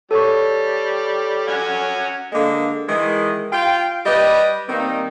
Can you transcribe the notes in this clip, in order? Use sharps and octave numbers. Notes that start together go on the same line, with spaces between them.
G3 A4 C#5 C#6
C#4 F#4 G#5
D3 G#3 A#3
D#3 E3 G#3
F4 F5 G5
G3 G4 B4 D#5
D#3 G3 A#3 C4 D#4